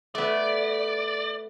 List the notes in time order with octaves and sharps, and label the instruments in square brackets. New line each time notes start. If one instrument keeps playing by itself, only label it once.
[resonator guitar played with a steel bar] A3 B3 [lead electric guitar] D5